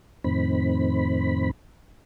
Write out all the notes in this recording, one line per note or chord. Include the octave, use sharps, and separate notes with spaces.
F2 A2 D#3 C4 B5